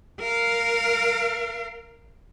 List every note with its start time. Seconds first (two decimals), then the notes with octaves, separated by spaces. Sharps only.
0.20 A#4 F5